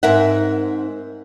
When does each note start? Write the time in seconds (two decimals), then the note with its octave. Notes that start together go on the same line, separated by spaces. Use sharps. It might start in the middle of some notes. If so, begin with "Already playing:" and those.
0.03 G#2 C4 A#4 E5 F#5